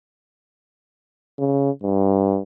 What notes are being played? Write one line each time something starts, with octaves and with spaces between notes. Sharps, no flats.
C#3
G2